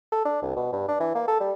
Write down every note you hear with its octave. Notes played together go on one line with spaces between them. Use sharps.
A4
D4
C2
B2
G2
D4
E3
A#3
A4
G3